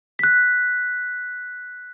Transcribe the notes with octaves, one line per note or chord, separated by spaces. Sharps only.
F#6 B6